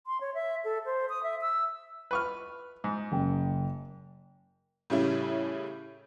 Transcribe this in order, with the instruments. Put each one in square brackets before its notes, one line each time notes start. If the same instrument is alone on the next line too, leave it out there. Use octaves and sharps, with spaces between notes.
[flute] C6
C#5
E5
A4
C5
D#6
E5
E6
[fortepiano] B4 C#6 F6
G#2
[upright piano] F#1 F#2 G5
[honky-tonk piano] A2 C#3 G3 C#4 E4